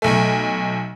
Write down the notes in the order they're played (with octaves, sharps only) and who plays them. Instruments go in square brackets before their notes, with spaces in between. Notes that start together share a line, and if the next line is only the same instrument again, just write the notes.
[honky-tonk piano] B1 A3